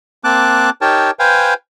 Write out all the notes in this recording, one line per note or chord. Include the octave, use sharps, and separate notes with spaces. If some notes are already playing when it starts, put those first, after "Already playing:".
A#3 C4 A5 D6 F#6
D#4 G4 A#4 C#5 G5 A5
B4 C5 F5 G5 G#5